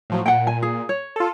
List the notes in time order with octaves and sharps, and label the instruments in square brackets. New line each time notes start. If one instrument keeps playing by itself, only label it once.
[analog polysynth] A2 F3 F#3
[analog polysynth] A#2 [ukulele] F#5 G5
[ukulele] G#5
G#4
C#5
[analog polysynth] F4 A4